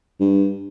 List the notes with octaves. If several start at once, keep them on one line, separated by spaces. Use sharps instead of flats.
G2